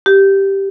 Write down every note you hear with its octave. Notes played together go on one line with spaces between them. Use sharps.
G4